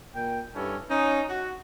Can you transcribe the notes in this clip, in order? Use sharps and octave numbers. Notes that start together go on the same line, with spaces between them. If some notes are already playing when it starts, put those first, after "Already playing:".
A#2 G5
G2 G3 C#4 E4 A4
C#4 D#4
F#4